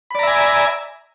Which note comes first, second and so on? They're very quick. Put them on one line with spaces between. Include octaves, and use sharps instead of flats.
B5 D5 A#5 E5 G#5